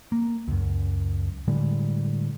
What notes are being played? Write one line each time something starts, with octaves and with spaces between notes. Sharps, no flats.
A#3
C#2 F#2
A2 D3 G3 G#3